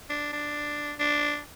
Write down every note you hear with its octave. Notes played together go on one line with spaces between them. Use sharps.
D4
D4
D4